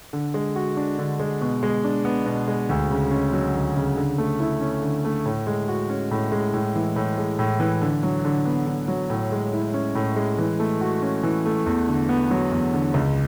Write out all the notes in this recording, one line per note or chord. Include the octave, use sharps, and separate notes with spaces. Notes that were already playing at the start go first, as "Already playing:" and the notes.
D3
G#3
F#4
D4
D3
G#3
B2
G#3
D4
B3
B2
G#3
D2
C#3
C#4
F#3
D2
C#3
D3
A3
E4
C#4
D3
A3
A2
G#3
F#4
C#4
A2
G#3
A2
E3
A2
G#3
A2
E3
D3
F#3
D3
B3
D3
F#3
A2
G#3
E4
C#4
A2
G#3
E3
A3
F#4
C#4
E3
A3
E2
D3
B3
F#3
E2
D3
C#2